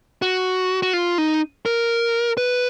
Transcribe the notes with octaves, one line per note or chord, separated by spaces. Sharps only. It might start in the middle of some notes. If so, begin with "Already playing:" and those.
F#4
F#4
F4
D#4
A#4
B4